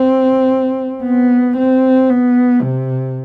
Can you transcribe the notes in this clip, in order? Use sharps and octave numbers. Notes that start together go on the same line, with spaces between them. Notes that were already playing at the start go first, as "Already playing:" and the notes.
Already playing: C4
B3
C4
B3
C3